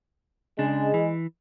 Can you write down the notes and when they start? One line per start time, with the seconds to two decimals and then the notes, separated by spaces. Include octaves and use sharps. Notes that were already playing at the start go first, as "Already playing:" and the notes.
0.59 C#3 G#3 D4
0.94 E3